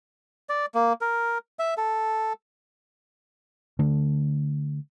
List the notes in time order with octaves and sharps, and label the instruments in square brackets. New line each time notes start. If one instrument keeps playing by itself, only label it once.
[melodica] D5
A#3
A#4
E5
A4
[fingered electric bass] D3 A3